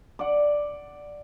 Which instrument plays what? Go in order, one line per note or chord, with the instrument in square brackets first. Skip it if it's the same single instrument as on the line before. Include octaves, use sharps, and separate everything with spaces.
[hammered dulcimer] D5 F#5